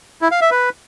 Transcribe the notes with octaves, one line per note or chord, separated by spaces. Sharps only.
E4
F5
E5
B4